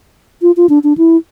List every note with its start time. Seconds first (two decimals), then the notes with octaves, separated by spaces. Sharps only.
0.42 F4
0.57 F4
0.69 D4
0.84 D4
0.98 E4